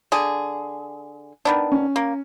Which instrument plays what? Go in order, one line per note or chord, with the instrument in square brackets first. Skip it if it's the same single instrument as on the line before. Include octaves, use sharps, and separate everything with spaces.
[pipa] D3 G#4
D#3 B3 D4
[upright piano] C#4
[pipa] A#3